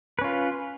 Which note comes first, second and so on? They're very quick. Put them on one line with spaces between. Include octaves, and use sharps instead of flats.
B4 C#4 F4